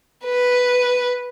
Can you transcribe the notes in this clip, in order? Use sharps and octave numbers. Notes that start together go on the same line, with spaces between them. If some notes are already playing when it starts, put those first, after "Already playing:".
B4